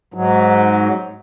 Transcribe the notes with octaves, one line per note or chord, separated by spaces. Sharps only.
G#2 F#3